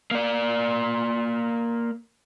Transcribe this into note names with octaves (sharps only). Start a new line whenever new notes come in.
A#3 D5